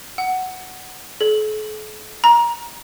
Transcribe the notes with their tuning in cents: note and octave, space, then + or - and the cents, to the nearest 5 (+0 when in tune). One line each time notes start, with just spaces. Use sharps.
F#5 +5
A4 -45
A#5 +20